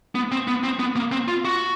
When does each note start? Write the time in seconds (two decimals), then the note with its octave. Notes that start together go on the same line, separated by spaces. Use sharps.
0.15 B3
0.32 C4
0.48 B3
0.63 C4
0.79 B3
0.96 A#3
1.12 C4
1.28 F4
1.45 F#4